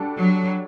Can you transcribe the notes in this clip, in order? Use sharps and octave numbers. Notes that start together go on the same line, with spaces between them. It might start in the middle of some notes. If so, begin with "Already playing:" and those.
Already playing: G3 D4 F#4 A4
F#3